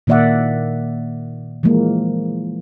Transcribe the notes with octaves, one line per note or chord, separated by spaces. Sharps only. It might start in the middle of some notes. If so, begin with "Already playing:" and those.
A#2 D#3 A#3 D5 E5 F#5
E3 F3 G#3 A#3